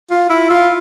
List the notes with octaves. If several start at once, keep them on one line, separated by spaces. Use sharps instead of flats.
F4
E4
F4